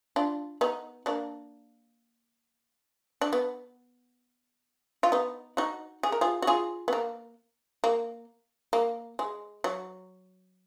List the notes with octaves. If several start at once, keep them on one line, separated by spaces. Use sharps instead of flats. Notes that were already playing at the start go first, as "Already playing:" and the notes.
D4 F4
B3 D#4
A#3 D4
D4
B3
F4
B3 D#4
D#4 F#4
G#4
A#4
F4 G#4
F#4
F4 G#4
B3
A#3
A#3
A#3
G#3
F#3